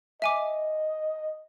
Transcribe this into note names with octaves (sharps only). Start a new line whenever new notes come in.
D#5 E5 G#5 D6